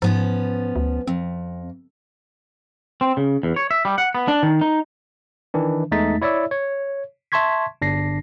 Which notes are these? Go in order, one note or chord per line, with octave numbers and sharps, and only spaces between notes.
G#2 F3 B3 C#4
D2
F2 C4
C4
C#3
E2
C#5
E5
G3
F#5
B3
D4
D#3
D#4
D#3 E3 D4
E2 G#3 A3 D#4 A6 B6
E4 C#5 D5 E5 E6
C#5
E5 A5 C6 C#6 G#6 B6
G1 D4 A#6 C7